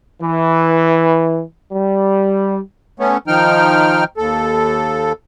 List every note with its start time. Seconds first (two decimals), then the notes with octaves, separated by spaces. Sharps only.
0.21 E3
1.72 G3
3.00 A3 B3 C#4
3.28 D#3 F3 D#4 G5 F6
4.17 D#2 A4